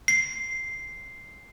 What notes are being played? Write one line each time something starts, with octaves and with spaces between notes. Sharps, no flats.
C7